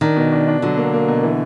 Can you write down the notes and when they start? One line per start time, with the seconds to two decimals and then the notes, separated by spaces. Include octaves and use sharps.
0.01 D#3 D4
0.16 B2
0.33 D4
0.48 D4
0.62 D3 F#3
0.77 A#3
0.93 A#3
1.08 B2
1.23 E3